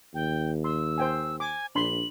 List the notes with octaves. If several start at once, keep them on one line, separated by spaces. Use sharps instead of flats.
D#2 G5
C6 E6
C5 G5 G#5
G#5 D6
A#1 D4 B5 C6 F#7